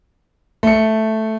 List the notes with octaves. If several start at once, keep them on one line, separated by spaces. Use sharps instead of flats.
A3 C#7